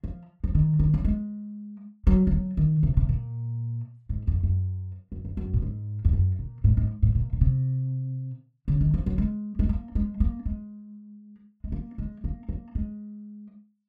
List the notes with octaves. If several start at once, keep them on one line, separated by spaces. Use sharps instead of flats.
F3
F3
D#3
D#3
F#3
G#3
F#3
F3
F#3
D#3
C3
C3
A#2
G#2
F2
F#2
F#2
F2
F#2
A#2
G#2
F2
F#2
A#2
G#2
G#2
G#2
A#2
A#2
C3
C#3
D#3
F3
F#3
G#3
G#3
A#3
G#3
A#3
G#3
G#3
A#3
G#3
A#3
A#3
G#3